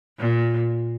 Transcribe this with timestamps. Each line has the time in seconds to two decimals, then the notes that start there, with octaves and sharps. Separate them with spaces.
0.19 A#2